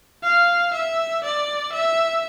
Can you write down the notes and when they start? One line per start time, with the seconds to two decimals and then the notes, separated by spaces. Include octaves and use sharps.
0.23 F5
0.74 E5
1.24 D5
1.73 E5